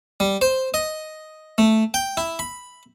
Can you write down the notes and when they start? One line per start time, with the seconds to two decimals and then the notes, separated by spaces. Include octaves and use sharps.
0.20 G3
0.41 C5
0.74 D#5
1.58 A3
1.94 G5
2.17 E4
2.39 B5